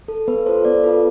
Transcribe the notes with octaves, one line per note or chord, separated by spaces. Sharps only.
A4
B3 B4
F4 A4 C5
B3 D5
F4 A4 B4